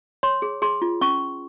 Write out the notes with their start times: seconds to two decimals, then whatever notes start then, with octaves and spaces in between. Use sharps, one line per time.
0.23 C#5 C6
0.42 G#4
0.62 G#4 C6
0.82 F4
1.01 C#4 C#6